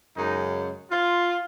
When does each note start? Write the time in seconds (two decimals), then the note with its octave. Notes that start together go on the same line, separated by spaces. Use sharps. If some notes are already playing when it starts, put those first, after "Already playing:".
0.16 F#2 C#3 G#3 D#4
0.91 F4